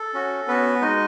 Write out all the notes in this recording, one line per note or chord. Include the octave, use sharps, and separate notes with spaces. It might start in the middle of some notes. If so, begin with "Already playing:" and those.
Already playing: A4
C#4 F#4
B3 C#4 F#4 B4
G#3 D#4 F#4 D#5